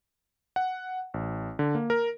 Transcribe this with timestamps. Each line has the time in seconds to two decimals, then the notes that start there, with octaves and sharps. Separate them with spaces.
0.56 F#5
1.14 A1
1.59 D3
1.75 A#3
1.90 A#4